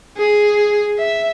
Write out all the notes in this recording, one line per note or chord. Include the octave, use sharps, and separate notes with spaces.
G#4
E5